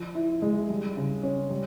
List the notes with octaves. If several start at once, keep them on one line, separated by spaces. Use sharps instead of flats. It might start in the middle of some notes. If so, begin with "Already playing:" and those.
Already playing: F3
E4
G#3
G3
C#3
C#4
G3